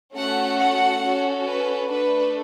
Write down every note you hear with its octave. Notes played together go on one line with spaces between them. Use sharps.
A3 C#4 F#4 A4 F#5
F#5
C#4 F#4 A4
B4
A3 D4 A4 B4